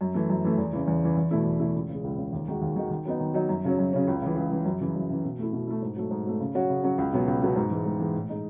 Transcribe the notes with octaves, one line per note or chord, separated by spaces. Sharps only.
F#2
E3 A3
F#2
E3 A3
E2
C#3 E3
E2
C#3 E3
E2
B2 A3 E4
E2
B2 A3 E4
C#2
C#3 G#3
C#2
C#3 G#3
D#2
D#3 G#3 D#4 F#4
D#2
D#3 G#3 D#4 F#4
D#3
F#3 B3 D#4
D#3
F#3 B3 D#4
F#2
C#3 F#3 C#4
F#2
C#3 F#3 C#4
C#2
C#3 E3
C#2
C#3 E3
F#2
C#3 E3
F#2
C#3 E3
B2
A3 E4
B2
A3 E4
G#2
F#3 A3
G#2
F#3 A3
C#3
F#3 C#4 F#4
C#3
F#3 C#4 F#4
C#2
B2 F#3 B3
C#2
B2 F#3 B3
G#2
E3 G#3
G#2
E3 G#3
A2
G#3 D#4